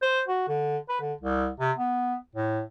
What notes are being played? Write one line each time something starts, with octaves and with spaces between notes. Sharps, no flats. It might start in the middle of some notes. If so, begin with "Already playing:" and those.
C5
F#4
D3
B4
D3
C2
C3
B3
A2